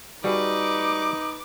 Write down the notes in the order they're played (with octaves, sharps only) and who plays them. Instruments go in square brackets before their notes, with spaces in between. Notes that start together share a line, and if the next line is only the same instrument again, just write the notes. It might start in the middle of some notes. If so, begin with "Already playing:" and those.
[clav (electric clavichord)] G3 F#4 G#4 [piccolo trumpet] D#4 [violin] B4 [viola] D6